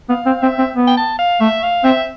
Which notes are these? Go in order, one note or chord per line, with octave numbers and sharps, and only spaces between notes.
B3 F5
C4
C4 E5
C4
B3
G5
A5
F5
A3 E5
F5
C4 E5